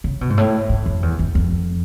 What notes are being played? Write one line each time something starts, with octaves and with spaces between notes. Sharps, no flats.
C#3
B2
G#2
A2
A2
F2
E2
E2
F2